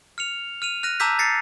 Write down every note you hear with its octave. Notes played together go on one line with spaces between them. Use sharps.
F6 C#7 F7
F6 D#7 F7
F6 F#6 A#6 D#7
A5 A#5 D6 E6 G6 B6
A6 A#6 C7 C#7